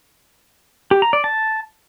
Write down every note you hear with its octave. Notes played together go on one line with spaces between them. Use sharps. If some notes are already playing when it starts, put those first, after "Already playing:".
G4
A#5
D5
A5